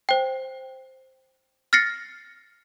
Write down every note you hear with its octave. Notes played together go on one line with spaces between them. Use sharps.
C5 G5
F6 A6 A#6 C7 C#7